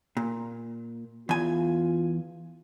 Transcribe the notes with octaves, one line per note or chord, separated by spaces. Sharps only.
A#2
E2 F4 G#5